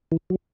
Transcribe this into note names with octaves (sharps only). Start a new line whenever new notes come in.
E3
F#3